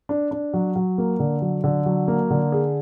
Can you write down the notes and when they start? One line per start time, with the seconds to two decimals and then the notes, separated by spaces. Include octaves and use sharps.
0.09 D4
0.31 D4
0.54 F#3
0.76 F#3
0.98 A#3
1.20 D3
1.42 F#3
1.64 D3
1.86 F#3
2.08 A#3
2.30 D3
2.52 G#4